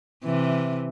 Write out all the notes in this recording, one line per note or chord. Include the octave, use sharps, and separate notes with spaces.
C3 E3